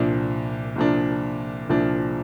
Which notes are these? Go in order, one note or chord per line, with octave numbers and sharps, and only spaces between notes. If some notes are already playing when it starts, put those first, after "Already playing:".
Already playing: C2 A#2 F3 D4
C2 A#2 F3 D4
C2 A#2 F3 D4